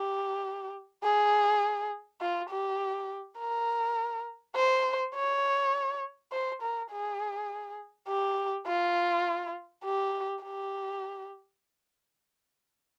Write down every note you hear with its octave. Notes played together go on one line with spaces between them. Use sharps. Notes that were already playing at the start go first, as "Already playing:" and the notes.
Already playing: G4
G#4
F4
G4
A#4
C5
C#5
C5
A#4
G#4
G4
F4
G4
G4